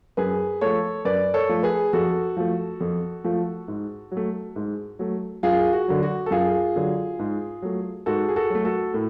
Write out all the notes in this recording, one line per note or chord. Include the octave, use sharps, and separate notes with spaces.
F#2 G#4 B4
F3 A3 A4 C#5
F#2 B4 D5
A4 C#5
F3 A3
G#4 B4
F2 F#4 A4
F3 A3
F2
F3 A3
G#2
F#3
A3
G#2
F#3 A3
F#2 F4 G#4
F#4
D3 F#3
F#4
A4
F#2 F4 G#4
D3 F#3
G#2
F#3 A3
G#2 F#4 A4
G#4
F#4 A4
F#3 A3
F#4 A4
A2